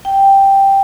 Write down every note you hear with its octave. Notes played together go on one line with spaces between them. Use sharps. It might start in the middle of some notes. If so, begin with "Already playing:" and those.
G5